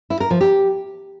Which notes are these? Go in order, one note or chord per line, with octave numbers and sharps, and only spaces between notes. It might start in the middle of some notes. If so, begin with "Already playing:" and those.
E4
A#4
F3
G4